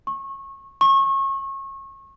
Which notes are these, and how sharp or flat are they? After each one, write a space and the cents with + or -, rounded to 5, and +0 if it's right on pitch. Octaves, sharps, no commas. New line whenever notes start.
C#6 -25
C#6 -30